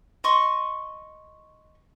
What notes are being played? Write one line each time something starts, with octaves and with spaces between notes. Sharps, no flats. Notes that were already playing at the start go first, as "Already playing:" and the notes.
D#5 C6 C#6